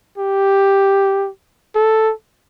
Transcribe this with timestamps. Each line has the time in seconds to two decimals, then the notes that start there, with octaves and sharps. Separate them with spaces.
0.18 G4
1.75 A4